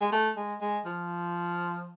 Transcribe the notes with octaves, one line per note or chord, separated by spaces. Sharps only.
G#3
A3
G#3
G#3
F3